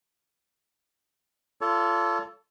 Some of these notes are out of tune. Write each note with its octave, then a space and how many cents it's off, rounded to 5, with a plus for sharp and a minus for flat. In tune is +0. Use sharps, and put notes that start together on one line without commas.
F4 -20 A4 +5 C#5 +40